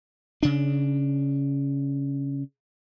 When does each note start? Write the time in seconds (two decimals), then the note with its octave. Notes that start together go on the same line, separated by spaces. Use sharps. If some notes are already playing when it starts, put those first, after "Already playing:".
0.43 C#3 D4